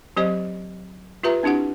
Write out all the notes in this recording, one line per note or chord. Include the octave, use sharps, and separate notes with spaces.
F#3 C4 G4 C5 D#5
F4 G4 B4 E5 A#5
C4 D4 E4 G4 F#5